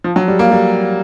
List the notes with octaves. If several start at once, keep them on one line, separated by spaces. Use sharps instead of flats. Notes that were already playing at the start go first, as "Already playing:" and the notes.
F3
F#3
G3
A#3
G3